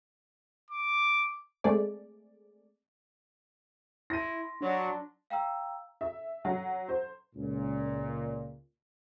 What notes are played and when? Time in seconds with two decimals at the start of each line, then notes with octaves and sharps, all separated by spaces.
0.71 D6
1.64 G#3 A3 C4 G#4 D5
4.10 E4 C6 A#6 D#7
4.61 F#3 D4
5.30 F5 G5 A#5 E6
6.01 E5
6.45 F#3
6.89 C5
7.35 C#2 A#2